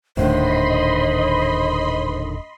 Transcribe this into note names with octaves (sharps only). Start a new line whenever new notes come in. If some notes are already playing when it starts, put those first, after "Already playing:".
D#1 A2 D3 D#3 C5 D#5 B5 C6